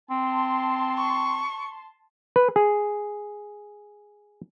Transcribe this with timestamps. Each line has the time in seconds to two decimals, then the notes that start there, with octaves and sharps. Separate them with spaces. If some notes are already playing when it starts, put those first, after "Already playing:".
0.10 C4 A5 C6
0.98 C#6
2.36 B4
2.56 G#4